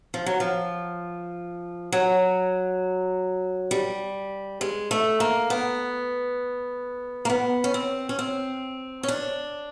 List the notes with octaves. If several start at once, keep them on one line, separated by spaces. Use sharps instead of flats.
F3
F#3
F3
F#3
G3
G#3
A3
A#3
B3
A#3
B3
C#4
C4
C#4
C4
C#4
D4